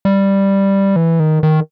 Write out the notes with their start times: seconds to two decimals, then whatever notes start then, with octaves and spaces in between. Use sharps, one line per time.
0.05 G3
0.96 E3
1.20 D#3
1.43 D#3